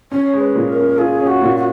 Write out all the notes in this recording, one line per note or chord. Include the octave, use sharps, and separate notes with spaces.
C#4 C#5
G#3
B4
A#2
A#4
C#4
F4 G#4
C#4
F#4
A#2
F#4